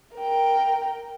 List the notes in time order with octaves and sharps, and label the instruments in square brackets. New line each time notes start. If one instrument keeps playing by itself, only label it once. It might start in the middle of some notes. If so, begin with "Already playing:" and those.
[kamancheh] A#4 G5